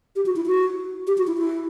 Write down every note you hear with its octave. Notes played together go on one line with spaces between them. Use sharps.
G4
F#4
E4
F#4
G4
F#4
E4
E4